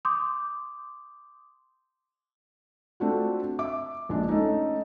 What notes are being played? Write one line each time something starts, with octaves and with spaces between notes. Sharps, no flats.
C6 D6 D#6 G6
A3 C4 D4 F4 F#4
E5 D6
A#1 G#3 D4
A3 C#4 D#4